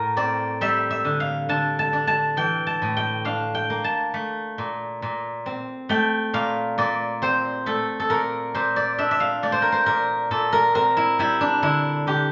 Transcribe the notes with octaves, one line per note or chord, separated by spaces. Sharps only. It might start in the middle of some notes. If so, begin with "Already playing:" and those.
Already playing: A2 A#4
C4 D5
G3 E5
E5
D3
F5
D3 A5
A5
D4
A5
E3 G5
A5
A2
G5
D4 F5
G5
A#3
A5
A3
A#2
A#2
C4
A3 G5
A#2 F5
A#2 D5
C4 C5
A3 A4
A4
A#2 A#4
A#2 C5
D5
D4 E5
E5
F5
A3 D5
C5
A#4
C5
A#2 A#4
A#2 A4
A#4
C4 A#4
E4
G3 E4
D4
D3 E4
D3 G4